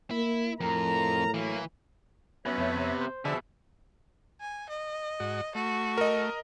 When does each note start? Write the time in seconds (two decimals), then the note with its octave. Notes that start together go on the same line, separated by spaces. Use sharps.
0.11 A#3 E4
0.60 F2 A2 A#4 A#5
1.34 E3 F#3 A#3
2.46 F#2 B3 C#5 E5
2.58 F2 B2 A3
2.76 C3
3.01 C5
3.25 B2 D3 F3 G#4 E5 A5
4.41 G#5
4.69 D#5
5.20 G#2 F#4
5.55 A3 F#4
5.98 A#4 D#5